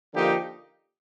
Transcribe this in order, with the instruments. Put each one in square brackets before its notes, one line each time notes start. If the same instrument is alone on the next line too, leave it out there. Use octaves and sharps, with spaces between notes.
[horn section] D3 F3 A#3 D#4 G4